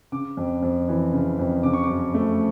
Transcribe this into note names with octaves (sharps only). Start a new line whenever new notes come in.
C#3 D6
F2
F2
E3
C#3
F2
C#3 D6
C#6
D6
F#2
A3